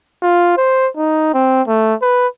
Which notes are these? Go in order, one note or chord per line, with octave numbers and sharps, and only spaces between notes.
F4
C5
D#4
C4
A3
B4